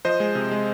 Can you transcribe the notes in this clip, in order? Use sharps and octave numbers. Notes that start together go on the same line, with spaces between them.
F3 C5 D#5
G#3
C3
G#3